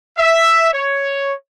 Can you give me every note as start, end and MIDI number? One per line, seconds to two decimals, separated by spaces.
0.18 0.69 76
0.73 1.33 73